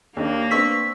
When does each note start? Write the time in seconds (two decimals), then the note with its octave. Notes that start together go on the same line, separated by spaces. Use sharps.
0.17 D#2 A#3 D4
0.51 B3 C4 D4 C#6 E6 B6